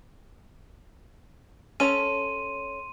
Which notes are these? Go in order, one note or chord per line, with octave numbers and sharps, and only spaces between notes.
C#4 A4 C#5 C6 D#7